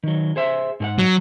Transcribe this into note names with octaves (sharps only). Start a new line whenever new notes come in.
D#3 F#3
G#4 C5 E5
G#2 G#4 F#5
F#3